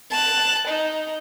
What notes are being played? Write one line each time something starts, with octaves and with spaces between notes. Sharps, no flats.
A5 F#6
D#4